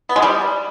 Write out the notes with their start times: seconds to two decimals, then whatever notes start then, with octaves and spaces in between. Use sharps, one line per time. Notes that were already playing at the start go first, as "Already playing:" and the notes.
0.09 B3
0.16 G#3
0.22 G3